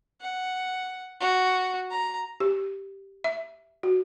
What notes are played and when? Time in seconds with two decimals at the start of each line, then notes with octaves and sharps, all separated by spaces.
0.21 F#5
1.21 F#4
1.91 A#5
2.40 G4
3.24 E5
3.83 F#4